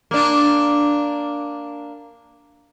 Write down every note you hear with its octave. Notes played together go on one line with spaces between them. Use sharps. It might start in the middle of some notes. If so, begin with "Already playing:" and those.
A#3 D4